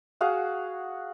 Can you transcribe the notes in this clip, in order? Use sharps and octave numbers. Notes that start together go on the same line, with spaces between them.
F#4 G#4 F5 F#5